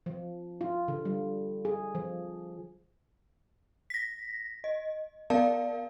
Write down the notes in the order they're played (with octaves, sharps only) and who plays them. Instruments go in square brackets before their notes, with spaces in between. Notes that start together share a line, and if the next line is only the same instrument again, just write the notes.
[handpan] F3
F4
D3
G3
G#4
F3
[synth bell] A#6 B6
D#5
B3 A#4 D5 F5 A5